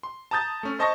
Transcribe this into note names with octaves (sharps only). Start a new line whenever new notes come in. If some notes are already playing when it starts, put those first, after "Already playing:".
C6
A5 A#5 D#6 G6 A6
A3 C#4
C5 D#5 A5 C#6 A#6